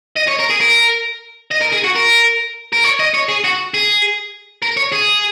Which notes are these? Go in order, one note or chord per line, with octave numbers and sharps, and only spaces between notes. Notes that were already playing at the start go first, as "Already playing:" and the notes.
D#5
C#5
A#4
G#4
A#4
D#5
A#4
G#4
F#4
A#4
A#4
C#5
D#5
C#5
G#4
F#4
G#4
A#4
C#5
G#4